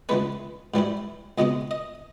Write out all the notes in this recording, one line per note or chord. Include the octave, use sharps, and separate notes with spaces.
C#2 C#3 E3 G#3 C#4 B4
G#2 E3 G3 C#4 E4
C#2 B2 G#3 C#4 D#5
D#5